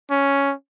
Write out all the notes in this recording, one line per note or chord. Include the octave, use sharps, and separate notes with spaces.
C#4